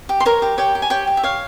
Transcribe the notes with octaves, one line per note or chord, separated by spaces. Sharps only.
G4
C6
A#4 C#5 A#5
G4
G4 C#5 G5
G4
G#5
G4 C#5 G5
G4
E5
C#5 F5